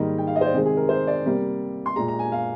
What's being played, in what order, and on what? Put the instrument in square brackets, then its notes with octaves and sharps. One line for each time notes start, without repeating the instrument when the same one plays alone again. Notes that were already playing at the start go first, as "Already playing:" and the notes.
Already playing: [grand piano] G#2 D#3 G3 A#3 D#5
G5
F5
D#5
C5
D5
C3 D#3 G#3 G#4
G#4
A#4
C5
D5
C3 G3 A#3
C6
A#2 G#3 A#5
A#5
G#5
F5